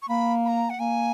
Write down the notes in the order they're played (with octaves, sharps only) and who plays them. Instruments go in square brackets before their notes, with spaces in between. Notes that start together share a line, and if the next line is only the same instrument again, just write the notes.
[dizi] C#6
[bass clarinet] A#3 [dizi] B5
[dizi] B5
A#5
F#5
[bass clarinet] A#3 [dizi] G#5